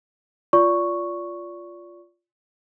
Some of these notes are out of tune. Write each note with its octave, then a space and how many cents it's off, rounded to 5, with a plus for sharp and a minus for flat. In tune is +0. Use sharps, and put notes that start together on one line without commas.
F4 +0 D5 -25 C#6 +0